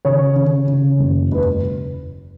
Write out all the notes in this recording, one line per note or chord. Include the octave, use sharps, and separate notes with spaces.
C#3 C#5
C#3
C#3
F#1
E1 B4